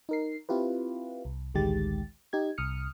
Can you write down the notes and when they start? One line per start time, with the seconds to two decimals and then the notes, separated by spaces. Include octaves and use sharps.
0.09 D#4 A#4 C7
0.49 C4 E4 F4 G4 B4
1.25 C2
1.54 A1 D2 D#3 G#3 G4 A6
2.33 D#4 G4 G#6
2.58 C2 D#6 F6 C#7